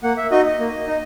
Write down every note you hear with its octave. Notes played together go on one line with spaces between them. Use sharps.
A#3 F#5
E5
D#4 F#4 D#5
D#5
A#3
D#4